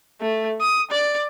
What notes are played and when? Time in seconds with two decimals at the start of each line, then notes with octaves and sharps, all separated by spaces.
0.21 A3
0.61 D#6
0.91 D5